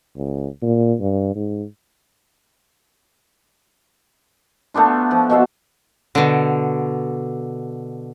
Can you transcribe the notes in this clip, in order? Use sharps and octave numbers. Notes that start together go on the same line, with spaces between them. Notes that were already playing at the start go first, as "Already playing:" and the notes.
C#2
A#2
G2
G#2
A3 B3 D4 F4
F3
B2 F#4 E5 F5
B2 D3